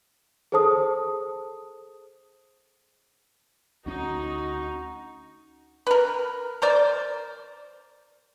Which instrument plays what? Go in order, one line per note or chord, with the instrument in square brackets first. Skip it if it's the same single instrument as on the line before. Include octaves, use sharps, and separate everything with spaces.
[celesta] G#4 A4 C5 A5 D#6
[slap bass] D2 C#4 [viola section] D#4 [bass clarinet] F#4
[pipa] A#4 B4
A#4 C5 D5